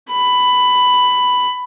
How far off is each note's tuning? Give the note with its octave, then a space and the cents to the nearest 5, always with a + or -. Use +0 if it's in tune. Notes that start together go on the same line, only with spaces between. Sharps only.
B5 +10